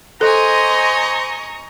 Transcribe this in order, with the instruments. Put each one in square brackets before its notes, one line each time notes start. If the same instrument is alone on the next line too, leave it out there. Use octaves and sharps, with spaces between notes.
[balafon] A4 [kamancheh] C5 [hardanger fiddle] D#5 G#5 [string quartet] A#5 C#6 D#6